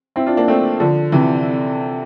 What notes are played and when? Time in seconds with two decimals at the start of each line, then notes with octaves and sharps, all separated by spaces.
0.16 C4 E4
0.26 D4 F4
0.37 A#3 D4
0.48 A3 C4
0.80 D3 F3
1.12 C3 E3